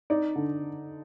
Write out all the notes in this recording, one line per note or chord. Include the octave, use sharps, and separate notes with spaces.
D#4 D5
D3